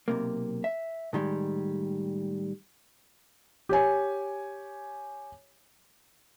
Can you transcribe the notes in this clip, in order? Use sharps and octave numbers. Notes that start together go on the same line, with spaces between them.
B1 C3 A#3
E5
A2 D#3 G3 G#3
G4 C#5 G#5